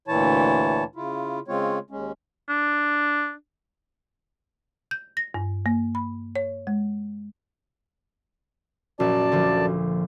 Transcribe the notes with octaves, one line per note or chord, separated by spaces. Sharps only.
D2 A#2 E3 E4 C#5 A5
C#3 E4 F4
C#3 G#3 C4 F4 C#5
D#2 G#3 C#4
D4
G6
A#6
G2
A#3
B5
C#5
G#3
A#1 F#2 D5 A5
D2 F3